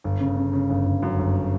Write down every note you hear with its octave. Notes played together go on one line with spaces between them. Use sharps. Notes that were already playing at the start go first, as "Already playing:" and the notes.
G1
C#3
C#3
C#3
G1
G1
F#2
G1